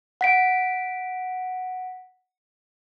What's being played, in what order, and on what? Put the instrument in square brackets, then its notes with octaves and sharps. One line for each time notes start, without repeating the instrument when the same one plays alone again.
[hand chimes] F#5 B6 D7